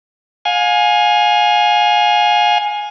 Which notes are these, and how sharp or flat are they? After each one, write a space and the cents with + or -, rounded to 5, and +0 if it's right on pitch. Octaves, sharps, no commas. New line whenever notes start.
F5 +35 G#5 +0